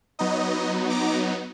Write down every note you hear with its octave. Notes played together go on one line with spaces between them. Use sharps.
F#3 B3 D#4 D#5
A#5 D6